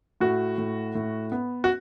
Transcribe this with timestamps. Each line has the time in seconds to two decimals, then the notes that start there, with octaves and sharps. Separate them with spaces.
0.20 A2 F#4
0.58 A2
0.95 A2
1.32 B3
1.64 F#4